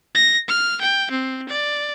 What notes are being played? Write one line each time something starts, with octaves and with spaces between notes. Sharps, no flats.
A#6
F6
G5
C4
D5